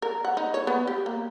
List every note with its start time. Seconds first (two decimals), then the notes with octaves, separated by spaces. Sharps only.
0.02 A#4
0.25 F#5
0.37 D#4
0.54 C#5
0.67 B3
0.87 G4
1.06 A#3